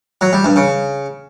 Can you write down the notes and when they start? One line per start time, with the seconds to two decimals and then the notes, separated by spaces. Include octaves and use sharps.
0.21 F#3
0.33 G3
0.44 G2
0.56 C#3